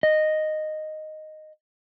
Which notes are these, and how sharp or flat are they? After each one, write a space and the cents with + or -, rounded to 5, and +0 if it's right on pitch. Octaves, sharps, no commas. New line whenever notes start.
D#5 -5